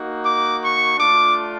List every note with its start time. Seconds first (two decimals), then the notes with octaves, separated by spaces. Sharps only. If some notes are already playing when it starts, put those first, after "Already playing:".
Already playing: A#3 D#4 F#4
0.23 D6
0.61 C#6
0.97 A3 D4 F4 D6